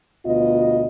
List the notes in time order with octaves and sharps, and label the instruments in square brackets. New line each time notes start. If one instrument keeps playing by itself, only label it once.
[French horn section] D2 B2 B3 F4 D#5